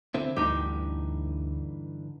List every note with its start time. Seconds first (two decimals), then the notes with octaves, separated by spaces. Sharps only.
0.14 D3 C4 E4
0.36 D2 G2 D3 E3 D#4 G4